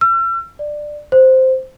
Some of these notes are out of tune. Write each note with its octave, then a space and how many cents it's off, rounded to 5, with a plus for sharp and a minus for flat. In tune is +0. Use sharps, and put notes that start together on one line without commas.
E6 +45
D5 +15
C5 -5